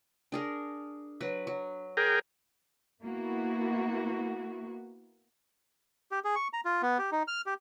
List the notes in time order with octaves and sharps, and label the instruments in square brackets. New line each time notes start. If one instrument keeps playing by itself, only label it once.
[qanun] D4 G#4 A#4
F#3 B4
F#3
[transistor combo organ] G#4 A#4 G5
[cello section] A#3 B3 E4 F#4
[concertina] G4
G#4
C#6
A#5
F4
B3
G4
D#4
F6
G4